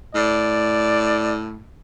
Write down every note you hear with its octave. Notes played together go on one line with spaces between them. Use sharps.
A2 D5